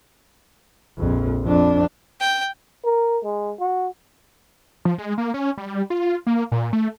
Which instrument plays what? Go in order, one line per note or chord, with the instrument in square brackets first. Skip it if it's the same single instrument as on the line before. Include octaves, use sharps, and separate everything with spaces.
[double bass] A#1 F2
F2 D4
[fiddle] G5
[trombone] A#4
G#3
F#4
[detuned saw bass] F3
G#3
A#3
C#4
G3
F4
A#3
A#2
A3